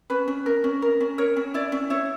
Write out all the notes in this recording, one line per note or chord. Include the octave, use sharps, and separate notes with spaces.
C#4 B4
C#4
A#4
C#4
A#4
C#4
A#4 C#5
C#4
E4 D5
C#4
E4 C#5